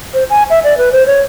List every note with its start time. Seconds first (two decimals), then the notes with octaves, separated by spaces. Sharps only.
0.14 C5
0.30 G#5
0.50 E5
0.64 D5
0.78 B4
0.92 C5
1.07 C#5